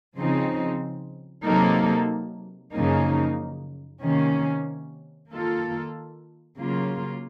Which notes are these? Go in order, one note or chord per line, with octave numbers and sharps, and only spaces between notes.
C#3 F3 C4 D#4
C3 F#3 A#3 D#4 A4
F#2 C#3 F3 A#3 D#4
C3 D#3 A#3 C#4
D#3 A#3 F4 A4
C#3 F#3 A#3 F4